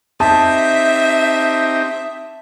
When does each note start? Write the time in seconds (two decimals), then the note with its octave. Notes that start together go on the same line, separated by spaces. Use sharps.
0.20 C4 D#4 G4 E5 A5